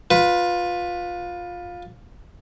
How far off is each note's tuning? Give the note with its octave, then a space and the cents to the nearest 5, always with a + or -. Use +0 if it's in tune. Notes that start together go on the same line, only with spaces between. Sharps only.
F4 +15 B4 +0